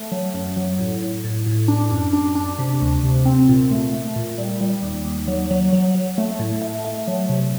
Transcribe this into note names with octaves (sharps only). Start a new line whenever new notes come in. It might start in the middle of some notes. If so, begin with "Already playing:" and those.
Already playing: A3
F#3
F#2
F#3
A2
A2
A2
A2
D4
F#2
D4
D4
C3
D2
C3
C4
A#2
A3
A3
A#2
G3
G3
D#2
D#2
F#3
F#3
F#3
F#3
A3
A2
A3
A3
F#3
C3